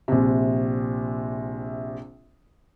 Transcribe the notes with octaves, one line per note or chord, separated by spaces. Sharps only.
A#1 C3